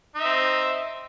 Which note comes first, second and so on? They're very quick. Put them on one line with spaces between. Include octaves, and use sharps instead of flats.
D#4 E5 C4